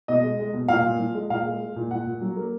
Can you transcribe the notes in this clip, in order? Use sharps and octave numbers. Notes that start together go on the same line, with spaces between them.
B2 D#5
G#3
G#3
B2
A#2 F5
A#2
F3
G#3
A#2 F5
G#3
G#3
A#2
A#2 F#5
A#2
F#3
A#3